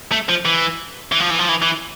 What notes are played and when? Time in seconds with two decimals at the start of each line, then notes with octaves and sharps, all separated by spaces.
0.12 A3
0.29 F3
0.46 E3
1.12 E3
1.20 F3
1.31 E3
1.39 F3
1.49 E3
1.62 E3